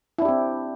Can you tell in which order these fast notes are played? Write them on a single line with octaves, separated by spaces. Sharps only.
E4 D4 G4 C4